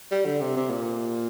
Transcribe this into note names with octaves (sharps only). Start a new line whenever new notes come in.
G3
D3
C3
C3
A#2